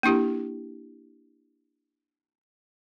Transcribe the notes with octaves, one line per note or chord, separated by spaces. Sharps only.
A#3 D4 E4 G4